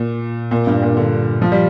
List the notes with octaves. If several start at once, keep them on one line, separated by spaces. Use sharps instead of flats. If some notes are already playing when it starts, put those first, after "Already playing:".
Already playing: A#2
A#2
G2
A#2
D3
F3
G3